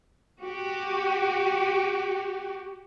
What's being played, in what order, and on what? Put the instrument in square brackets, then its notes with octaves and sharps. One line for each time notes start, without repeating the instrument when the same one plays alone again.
[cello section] F#4 G4